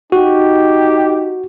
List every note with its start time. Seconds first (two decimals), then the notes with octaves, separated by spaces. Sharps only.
0.12 D#4 F#4 G4